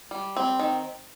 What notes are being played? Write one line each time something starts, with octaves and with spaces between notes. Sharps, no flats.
G3
C4
D#3